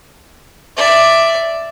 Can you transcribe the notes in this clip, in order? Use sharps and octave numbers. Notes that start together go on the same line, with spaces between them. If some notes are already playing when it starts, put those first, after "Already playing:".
D5 E5